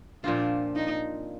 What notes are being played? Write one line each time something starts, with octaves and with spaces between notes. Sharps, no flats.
A#2 F3 C4 D4 F4
D#4